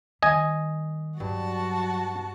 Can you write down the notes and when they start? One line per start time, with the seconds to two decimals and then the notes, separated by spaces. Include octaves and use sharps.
0.22 D#3 G3 D#5 G#5
1.20 G2 F#3 F#4 A5